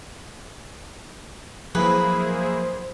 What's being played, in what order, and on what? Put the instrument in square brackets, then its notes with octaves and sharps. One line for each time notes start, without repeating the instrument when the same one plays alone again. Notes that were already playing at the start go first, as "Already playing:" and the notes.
[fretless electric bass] F3 F#3 [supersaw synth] A#3 E4 G#4 [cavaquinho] B4 [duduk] C5